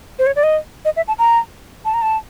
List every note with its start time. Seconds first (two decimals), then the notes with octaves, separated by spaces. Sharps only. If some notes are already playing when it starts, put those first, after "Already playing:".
0.19 C5
0.27 C#5
0.36 D5
0.43 D#5
0.85 D#5
0.96 E5
1.08 A5
1.19 A#5
1.85 A5
1.94 A#5
2.02 A5